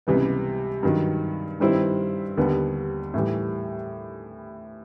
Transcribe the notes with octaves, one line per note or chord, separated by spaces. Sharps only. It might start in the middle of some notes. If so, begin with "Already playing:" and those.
C#2 C3 E3 G3 B3
G2 D#3 F#3
G2 D#3 G3 C4 E4
D#2 D3 G3 B3
A2 E3 G3